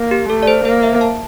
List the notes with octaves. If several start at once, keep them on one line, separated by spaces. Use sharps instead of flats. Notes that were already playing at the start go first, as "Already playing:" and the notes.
Already playing: A#3
G4
A3 A4
D5
C5
A#3 C5
E5
A5